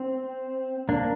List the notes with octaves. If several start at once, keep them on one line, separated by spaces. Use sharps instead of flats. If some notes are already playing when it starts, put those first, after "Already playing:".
Already playing: C4
A#3 D4